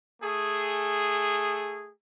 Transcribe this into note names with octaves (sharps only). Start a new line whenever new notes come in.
A3 G#4